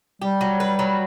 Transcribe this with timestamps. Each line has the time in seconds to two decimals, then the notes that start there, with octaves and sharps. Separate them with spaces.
0.22 G3 G4
0.41 F#3
0.60 B4
0.79 F#3